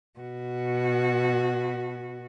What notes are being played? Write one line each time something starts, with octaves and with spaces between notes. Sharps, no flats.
B2 F#4